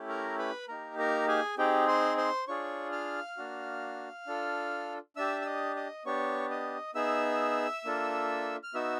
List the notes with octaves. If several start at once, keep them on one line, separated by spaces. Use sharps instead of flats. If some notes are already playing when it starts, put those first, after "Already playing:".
Already playing: A3 C#4 E4 G4
A#4 A#5
B4 B5
A#3 D#4 G4 A#4 A#5
A#4 A#5
G#4 G#5
C4 D#4 G4 G#4 G5
C5 C6
C5 C6
D4 F4 G#4 C#5 C#6
F5 F6
A#3 D4 F#4
D4 F4 A4
D4 G4 E5 E6
E6
D#5 D#6
D#5 D#6
B3 D4 G4 C#5 C#6
D#5 D#6
B3 D#4 G#4 E5 E6
A#3 D4 F4 A4
F6
B3 D#4 F#4 E5 E6